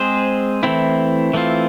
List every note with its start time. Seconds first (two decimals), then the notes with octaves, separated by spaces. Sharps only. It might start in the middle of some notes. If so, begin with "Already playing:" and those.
Already playing: G#3 C4 G#4 C5
0.63 E3 A3 C4 E4
1.33 E3 A3 C4 F4